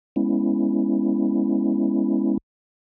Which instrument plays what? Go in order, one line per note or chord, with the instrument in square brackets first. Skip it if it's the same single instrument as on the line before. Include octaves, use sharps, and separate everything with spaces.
[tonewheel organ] G#3 B3 C#4 E4